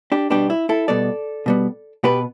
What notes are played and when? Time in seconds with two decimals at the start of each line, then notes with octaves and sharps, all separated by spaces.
0.12 D4 G4
0.30 B2 G3 B3 D4 G4
0.50 E4
0.69 E4 A4
0.88 B2 G3 B3 A4 D5
1.46 B2 G3 B3
2.03 B2 B3 G4 B4